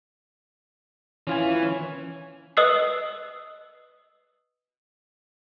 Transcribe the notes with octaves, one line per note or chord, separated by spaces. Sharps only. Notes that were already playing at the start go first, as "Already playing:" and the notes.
E3 C#4 F4 G#5
C#4
B4 D#5 D#6 E6 F#6 C7